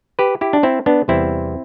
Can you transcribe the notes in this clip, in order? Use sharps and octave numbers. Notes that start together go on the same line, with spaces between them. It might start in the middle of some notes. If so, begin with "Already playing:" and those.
G4 B4
E4 G4
D4
C4 E4
B3 D4
E2 C3 G3 B3 C4 E4